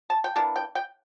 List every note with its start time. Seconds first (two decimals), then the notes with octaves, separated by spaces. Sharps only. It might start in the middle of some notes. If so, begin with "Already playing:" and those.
0.10 A5
0.24 G5
0.36 E3 A#3 D4 A5
0.56 G5
0.75 G5